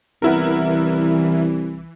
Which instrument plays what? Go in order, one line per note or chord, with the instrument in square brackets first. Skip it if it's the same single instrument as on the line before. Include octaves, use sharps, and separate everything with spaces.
[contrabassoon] C2 [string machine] E3 [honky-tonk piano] B3 E4 A#4